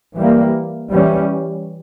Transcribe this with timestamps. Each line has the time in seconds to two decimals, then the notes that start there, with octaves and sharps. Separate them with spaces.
0.16 E3 G3 A#3
0.91 E3 G3 C#4